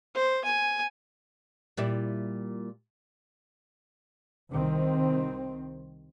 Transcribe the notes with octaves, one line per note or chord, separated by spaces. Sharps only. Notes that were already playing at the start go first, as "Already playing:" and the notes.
C5
G#5
A#2 G3 E4
C2 D#3 C4